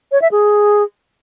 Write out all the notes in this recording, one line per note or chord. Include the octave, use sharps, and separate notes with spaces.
C#5
E5
G#4